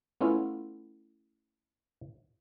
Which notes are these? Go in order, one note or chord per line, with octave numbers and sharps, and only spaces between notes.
A3 B3 C#4 E4 F4